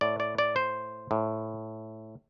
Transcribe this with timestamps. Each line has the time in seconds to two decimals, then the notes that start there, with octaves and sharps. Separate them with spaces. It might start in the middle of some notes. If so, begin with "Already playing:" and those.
0.01 A2 D5
0.20 D5
0.38 D5
0.56 C5
1.11 A2